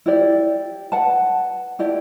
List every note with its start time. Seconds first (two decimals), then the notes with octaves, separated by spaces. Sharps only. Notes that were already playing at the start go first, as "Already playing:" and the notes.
0.06 E4 G4 D5
0.92 B4 F#5 A5
1.79 E4 G4 D5